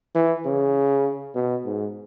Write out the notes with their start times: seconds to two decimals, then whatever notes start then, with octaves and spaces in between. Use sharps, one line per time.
0.15 E3
0.46 C#3
1.35 B2
1.66 G#2